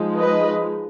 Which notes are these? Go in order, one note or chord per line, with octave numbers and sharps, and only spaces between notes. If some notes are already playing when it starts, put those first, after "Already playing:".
Already playing: F3 G#3 D#4
B4 D#5